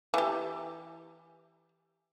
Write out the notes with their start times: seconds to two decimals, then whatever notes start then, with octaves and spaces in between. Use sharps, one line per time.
0.14 E3 G4